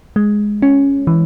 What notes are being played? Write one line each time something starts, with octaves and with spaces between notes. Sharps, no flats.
G#3
C#4
E3